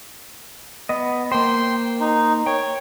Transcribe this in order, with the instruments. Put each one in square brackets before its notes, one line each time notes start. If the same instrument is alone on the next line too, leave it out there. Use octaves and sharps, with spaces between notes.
[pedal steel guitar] B3 D#5
[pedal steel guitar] A#3 C5 [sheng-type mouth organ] G5 C6
[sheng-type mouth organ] D#4
[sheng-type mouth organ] C#5 [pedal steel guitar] G5